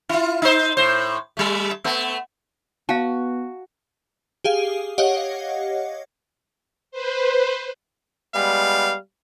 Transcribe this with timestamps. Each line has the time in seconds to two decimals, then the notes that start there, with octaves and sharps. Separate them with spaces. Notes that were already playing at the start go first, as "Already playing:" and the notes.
0.09 E4 F4
0.42 D#4 C5
0.77 A2 C5
1.37 G3 A3
1.84 A3 B3
2.89 B3 F#4 F5 A5
4.44 G4 G#4 F5
4.98 G4 C#5 D#5 F5 F#5
6.91 B4 C5
8.34 G3 G#3 B3 F5